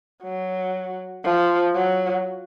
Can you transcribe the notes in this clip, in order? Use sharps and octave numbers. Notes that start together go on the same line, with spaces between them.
F#3
F3
F#3